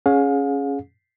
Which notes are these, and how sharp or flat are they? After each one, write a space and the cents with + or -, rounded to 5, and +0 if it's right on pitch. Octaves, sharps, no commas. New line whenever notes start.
C#4 +0 G#4 +10 F5 +40